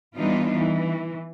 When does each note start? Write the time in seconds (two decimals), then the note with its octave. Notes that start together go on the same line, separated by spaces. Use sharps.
0.17 E3 G3 B3 D4 D#4 F4
0.55 E3